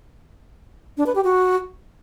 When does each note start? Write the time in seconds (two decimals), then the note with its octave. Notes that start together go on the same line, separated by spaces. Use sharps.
0.97 D4
1.06 B4
1.15 G4
1.24 F#4